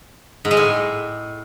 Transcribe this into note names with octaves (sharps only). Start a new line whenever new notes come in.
G#2
G#3
A2